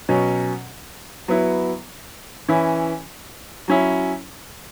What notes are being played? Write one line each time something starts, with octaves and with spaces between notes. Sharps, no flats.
B2 F#3 C#4
F#3 B3 E4
E3 C#4 E4
F#3 C#4 E4